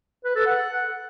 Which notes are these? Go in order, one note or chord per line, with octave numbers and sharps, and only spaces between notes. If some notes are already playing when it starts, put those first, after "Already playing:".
B4
A4
F#5